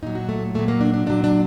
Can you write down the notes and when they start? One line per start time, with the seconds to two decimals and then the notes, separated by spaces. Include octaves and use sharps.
0.03 A#2 F#3 D#4
0.15 F#4
0.29 A3
0.54 A#2 F#3 A3
0.68 A#3
0.81 D4
0.94 D4
1.06 A#2 F#3 D4
1.24 D4